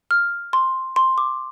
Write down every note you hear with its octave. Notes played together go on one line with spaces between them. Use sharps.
F6
C6
C6
D6